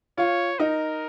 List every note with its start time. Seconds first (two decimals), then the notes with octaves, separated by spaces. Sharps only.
0.18 F4 C#5
0.59 D#4 A#4